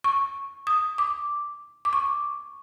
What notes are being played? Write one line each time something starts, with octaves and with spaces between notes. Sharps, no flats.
C#6
D#6
D6
D6
C#6